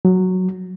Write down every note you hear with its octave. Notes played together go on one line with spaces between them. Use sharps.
F#3